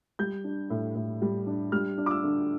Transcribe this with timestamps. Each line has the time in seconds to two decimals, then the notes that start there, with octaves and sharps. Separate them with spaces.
0.19 G3 G6
0.44 D4
0.70 A2
0.95 A2
1.22 G3
1.47 D4
1.72 G3 F6
1.98 D4
2.06 D6
2.11 E6
2.24 D3